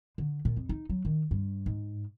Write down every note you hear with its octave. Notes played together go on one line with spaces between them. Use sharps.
D3
A#2
F2
D#4
F#3
D#3
G2
G#2